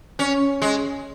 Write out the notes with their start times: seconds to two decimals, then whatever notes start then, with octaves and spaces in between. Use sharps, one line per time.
0.19 C#4
0.62 G#3